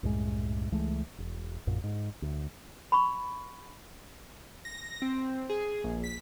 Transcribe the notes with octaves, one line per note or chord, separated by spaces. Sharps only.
C2 F#2 A2 G#3
C#2 E3 G#3 A3
E1
A#1 F#2 A#2
G#2
D2
B5 C#6
A#6
C4
G#4
A#1
B6